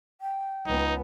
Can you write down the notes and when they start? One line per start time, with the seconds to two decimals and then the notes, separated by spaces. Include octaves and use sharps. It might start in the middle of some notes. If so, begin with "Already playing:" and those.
0.21 G5
0.67 C#2 B3 D#4